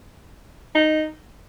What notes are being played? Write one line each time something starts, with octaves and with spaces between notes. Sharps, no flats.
D#4